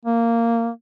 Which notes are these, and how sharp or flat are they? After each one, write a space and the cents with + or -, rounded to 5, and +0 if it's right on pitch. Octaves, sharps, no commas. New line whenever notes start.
A#3 -10